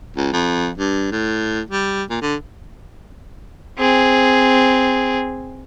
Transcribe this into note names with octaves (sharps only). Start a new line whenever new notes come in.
C#2
F2
G2
A2
G3
A#2
D3
C4 G#4